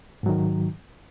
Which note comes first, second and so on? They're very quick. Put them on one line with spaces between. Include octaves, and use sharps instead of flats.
G#2 F#3 D#3